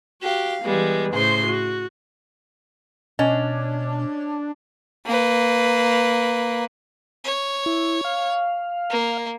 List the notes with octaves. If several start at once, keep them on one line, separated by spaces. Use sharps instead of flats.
F#4 G4 F5
E3 G3 G#3 B3
A2 C#3 C5 C6
F#4
B2 C#4 D4 D#5
A#3 B4
C#5
E4
F5
A#3